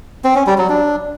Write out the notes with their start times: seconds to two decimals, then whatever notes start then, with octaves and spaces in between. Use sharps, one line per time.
0.24 C4
0.36 C#4
0.47 G3
0.58 F#3
0.69 D4